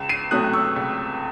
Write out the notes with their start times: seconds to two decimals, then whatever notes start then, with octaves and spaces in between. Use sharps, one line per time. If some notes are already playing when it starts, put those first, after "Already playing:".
Already playing: C#2 E7
0.09 C7 D#7
0.31 C3 F#3 A3 C#4 D#6 F#6
0.53 C#6 E6
0.76 C#2